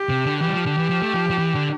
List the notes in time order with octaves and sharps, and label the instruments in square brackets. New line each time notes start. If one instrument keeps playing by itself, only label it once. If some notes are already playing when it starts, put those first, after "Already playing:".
Already playing: [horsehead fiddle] G4
[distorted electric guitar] C3
D3
[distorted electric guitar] E3 [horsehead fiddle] G4
[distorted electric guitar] G3
F3
D3
E3
F3
A3
F3
F3
E3
D3